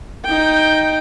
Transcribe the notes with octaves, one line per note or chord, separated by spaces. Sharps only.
D#4 G5